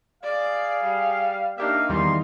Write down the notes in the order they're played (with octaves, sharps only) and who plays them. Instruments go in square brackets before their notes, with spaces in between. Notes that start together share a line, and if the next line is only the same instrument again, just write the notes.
[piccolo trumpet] G#4 [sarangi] D5 [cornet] F5
[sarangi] G3
[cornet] A#3 [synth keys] D4 G4 E5 [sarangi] D#4 [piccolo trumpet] F5
[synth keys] E2 D#3 G3 [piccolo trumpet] C6